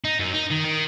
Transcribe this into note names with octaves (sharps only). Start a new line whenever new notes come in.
D#4
F#2
D#4
D#3
D#3